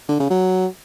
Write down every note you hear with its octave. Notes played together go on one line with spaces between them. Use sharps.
D3
C#3
F#3